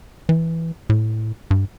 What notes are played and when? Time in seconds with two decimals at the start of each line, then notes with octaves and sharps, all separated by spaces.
0.29 E3
0.90 A2
1.51 G2